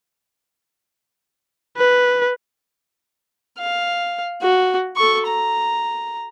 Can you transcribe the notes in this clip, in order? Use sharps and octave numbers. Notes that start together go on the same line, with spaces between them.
B4
F5
F#4
A4 C#6
A#5